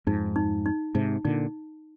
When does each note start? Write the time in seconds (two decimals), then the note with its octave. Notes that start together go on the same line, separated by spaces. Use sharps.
0.07 F2 G#2 D#4
0.36 D#4
0.66 D#4
0.95 G#2 C3 D#4
1.25 A#2 D3 D#4